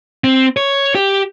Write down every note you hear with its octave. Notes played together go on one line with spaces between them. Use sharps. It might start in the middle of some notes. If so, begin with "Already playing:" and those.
C4
C#5
G4